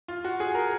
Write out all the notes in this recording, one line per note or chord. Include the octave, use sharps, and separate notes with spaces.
F4
F#4
G#4
A#4